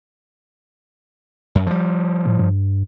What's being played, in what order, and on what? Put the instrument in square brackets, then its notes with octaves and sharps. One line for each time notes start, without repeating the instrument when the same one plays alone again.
[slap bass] F#2
F3 G3
[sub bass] A2
G2